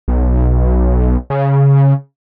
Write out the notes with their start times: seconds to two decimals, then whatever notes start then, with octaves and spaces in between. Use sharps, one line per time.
0.08 B1
1.30 C#3